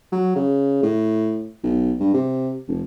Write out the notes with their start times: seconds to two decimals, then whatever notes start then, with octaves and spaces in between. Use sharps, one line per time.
0.12 F#3
0.36 C#3
0.83 A2
1.63 B1
2.00 G2
2.14 C3
2.68 F1